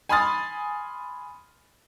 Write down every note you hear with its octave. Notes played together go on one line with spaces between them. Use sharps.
G#5 B5 C6 D#6 F6 A6